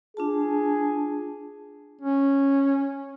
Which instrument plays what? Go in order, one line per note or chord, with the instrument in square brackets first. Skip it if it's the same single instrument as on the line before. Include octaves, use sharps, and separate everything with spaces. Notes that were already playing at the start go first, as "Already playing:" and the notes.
[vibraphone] D4 F4 A5 [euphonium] G#4
[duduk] C#4